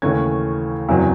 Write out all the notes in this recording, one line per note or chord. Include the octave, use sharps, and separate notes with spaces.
D#2 C#3 E3 A3 C#4 G#6
F#1 E2 C3 F#3